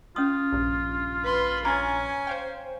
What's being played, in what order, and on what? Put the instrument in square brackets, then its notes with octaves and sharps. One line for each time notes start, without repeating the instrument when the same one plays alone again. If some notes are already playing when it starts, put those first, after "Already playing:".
[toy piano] C#4 D#6 [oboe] F4
[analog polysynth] A#1 G2
[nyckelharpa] B4 C6
[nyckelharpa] C#4 G#5 [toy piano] A#5 C6
[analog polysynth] C5 F5 G5